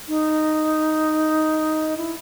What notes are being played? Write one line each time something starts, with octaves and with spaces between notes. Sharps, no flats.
D#4
E4